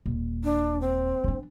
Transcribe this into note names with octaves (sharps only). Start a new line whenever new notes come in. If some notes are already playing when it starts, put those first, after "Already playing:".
D#1
D4
C4
E3 D4